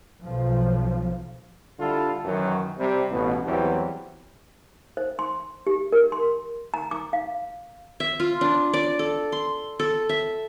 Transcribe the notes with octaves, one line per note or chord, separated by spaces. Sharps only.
B1 F3
D3 G3 E4 F4 A4
F#2 D#3 E3 F#3
C3 G3
A1 B2
E2 E3 F#3 G3 C4
C5
C6
G4
A#4
C6
A#5
D6
F5
E5
F4
D4
D5
A4
C6
A4
E5